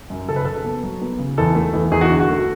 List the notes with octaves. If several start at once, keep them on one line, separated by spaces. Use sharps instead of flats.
F#2
C#3 A4
B4
C#3 A4
B3
F#3
B3
C#3
E2 A4
A3
E2
E2 G#4
F#4
D3
F#4
A3